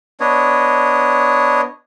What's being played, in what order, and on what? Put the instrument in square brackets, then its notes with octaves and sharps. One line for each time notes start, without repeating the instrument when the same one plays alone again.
[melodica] B3 D4 C#5 D#5